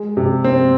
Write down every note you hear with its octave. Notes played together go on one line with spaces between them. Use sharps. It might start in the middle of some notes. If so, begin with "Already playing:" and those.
Already playing: G#3
C3
C4